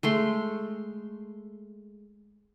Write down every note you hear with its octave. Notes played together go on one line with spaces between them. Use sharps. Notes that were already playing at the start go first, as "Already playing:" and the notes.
G#3 A3 C6